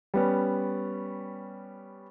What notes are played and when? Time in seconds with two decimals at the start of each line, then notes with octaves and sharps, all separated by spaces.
0.14 G3 B3 C#4